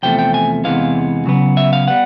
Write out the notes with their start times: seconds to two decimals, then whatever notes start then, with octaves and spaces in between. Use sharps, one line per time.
0.03 E2 C3 F3 A3 G5
0.19 G5
0.34 G#5
0.64 E2 C3 E3 G#3 B3 F5
1.25 C#3 F#3 B3
1.57 E5
1.73 F5
1.88 G3 B3 F#5